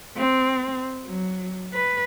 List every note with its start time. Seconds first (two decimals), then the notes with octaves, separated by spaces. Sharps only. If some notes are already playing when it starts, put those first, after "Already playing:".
0.17 C4
1.06 F#3
1.74 B4